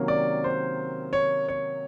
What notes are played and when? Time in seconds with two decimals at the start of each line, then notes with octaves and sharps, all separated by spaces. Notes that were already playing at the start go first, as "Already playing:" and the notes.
Already playing: C3 D#3 F#3 A#3 C#4
0.08 D5
0.44 C5
1.13 C#5
1.48 C#5